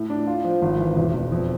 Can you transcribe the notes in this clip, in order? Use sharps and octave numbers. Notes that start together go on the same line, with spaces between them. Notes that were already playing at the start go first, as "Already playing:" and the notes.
Already playing: A2
D4
F4
F3
G#1
E3
E1
E1
F2